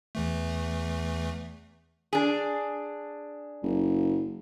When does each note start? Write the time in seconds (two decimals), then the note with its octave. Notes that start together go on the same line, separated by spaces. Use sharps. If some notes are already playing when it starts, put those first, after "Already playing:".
0.15 E2 E3 A3
2.13 D4 G#4
3.63 F#1